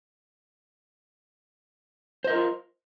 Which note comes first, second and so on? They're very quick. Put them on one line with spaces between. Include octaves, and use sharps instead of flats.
C5 D#5 A#4 F4